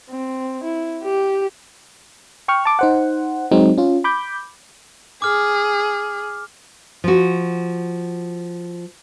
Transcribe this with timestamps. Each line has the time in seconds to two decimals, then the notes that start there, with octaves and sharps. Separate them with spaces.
0.11 C4
0.64 E4
1.03 G4
2.48 G5 C#6 F6
2.65 A5 D6
2.79 D#4 C5 F#5
3.51 F#3 G#3 C4 D#4
3.78 C#4 F4
4.04 B5 D6 G6
5.22 G#4 D6 F6
7.04 F3 F#4